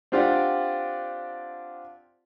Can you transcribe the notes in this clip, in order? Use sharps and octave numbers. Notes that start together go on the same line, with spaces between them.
C4 D4 F4 G4 D5 F#5